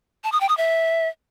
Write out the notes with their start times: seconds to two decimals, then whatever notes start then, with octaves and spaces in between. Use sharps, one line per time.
0.24 A5
0.32 D#6
0.41 G5
0.49 D#6
0.57 E5